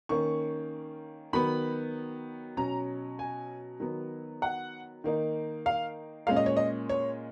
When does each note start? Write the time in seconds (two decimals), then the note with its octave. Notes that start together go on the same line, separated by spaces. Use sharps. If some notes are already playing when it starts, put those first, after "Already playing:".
0.09 D#3 A#3 C#4 C#6
1.33 D#3 F#3 B3 B5
2.57 B2 F#3 C#4 A#5
3.19 G#5
3.80 D#3 F#3 B3
4.42 F#5
5.04 D#3 A#3 D#4
5.66 F5
6.27 A#2 G#3 C#4 F5
6.37 D#5
6.46 C#5
6.57 D#5
6.89 C#5